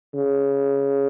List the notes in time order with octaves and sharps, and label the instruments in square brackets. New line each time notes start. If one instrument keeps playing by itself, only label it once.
[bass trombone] C#3